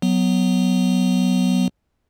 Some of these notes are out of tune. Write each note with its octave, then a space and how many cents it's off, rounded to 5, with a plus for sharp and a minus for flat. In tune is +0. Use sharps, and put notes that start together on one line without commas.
F#3 +0 B3 +10